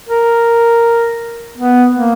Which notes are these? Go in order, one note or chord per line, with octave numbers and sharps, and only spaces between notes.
A#4
B3
A#3